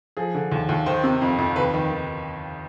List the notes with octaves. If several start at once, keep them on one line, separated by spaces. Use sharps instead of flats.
F3 G#4
D3
D#2
D#2
D#3 C5
C3
F2
F2
D#2 B4
D#3
D#3